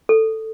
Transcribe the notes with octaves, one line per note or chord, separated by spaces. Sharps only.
A4